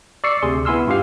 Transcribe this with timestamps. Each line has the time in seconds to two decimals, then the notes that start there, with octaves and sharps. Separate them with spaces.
0.24 D5 C#6 E6 C7 C#7
0.42 D2 C3 G4 G#4 C6
0.65 B3 E4 G#5 C6 E6 F6
0.87 G2 F4 G4 F5